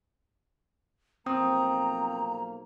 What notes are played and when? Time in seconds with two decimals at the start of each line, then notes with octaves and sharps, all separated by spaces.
1.26 B1 F3 A#3 C4 G5 A#5 D#6